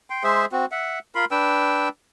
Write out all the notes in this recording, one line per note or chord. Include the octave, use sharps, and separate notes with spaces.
G5 C6
G#3 G#4 C5 E5
C4 F#4
E5 F#5
F4 A#4 B5 C6
D4 B4 G5 E6